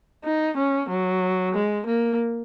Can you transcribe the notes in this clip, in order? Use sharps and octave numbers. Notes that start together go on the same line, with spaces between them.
D#4
C#4
F#3
G#3
A#3